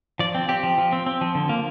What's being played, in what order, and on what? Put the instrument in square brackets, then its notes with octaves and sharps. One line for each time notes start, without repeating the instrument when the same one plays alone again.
[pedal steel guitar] F3 D5
C4
C4 G4
F3
F3
C4
C4
F3
D3
A#3